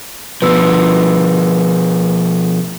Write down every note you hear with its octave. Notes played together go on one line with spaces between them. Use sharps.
B2 F3 B4 E6